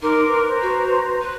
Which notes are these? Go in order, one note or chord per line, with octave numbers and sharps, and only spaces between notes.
D#4 A#4 A#5 C6 D6
B4
C5 A#5
F#4
B4